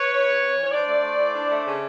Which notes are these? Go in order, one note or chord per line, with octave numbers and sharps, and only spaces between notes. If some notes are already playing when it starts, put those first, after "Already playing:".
Already playing: B4 C#5
E3
C#3
C4
E3
C#5
D4 C5 D5
A3
A3
E3
D4
A3
C#3